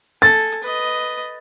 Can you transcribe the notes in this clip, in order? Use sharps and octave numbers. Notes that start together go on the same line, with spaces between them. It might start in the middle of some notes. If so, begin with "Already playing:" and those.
A4 G#5 A6
B4 D#5